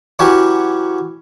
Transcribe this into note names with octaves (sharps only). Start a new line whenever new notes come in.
E3 F#3 C#4 G4